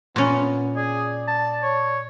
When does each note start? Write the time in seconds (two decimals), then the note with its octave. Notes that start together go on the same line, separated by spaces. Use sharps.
0.16 A#2 B3 C#4
0.77 G#4 D5
1.28 A5
1.63 C#5